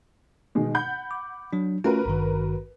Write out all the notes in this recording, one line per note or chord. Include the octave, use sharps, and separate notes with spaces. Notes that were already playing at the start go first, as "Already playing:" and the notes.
B2 D#3 G#3
F#5 B5 G6
D6
F#3 D4
A3 C#4 F4 F#4 A#4 B4
G#1 G2 D#3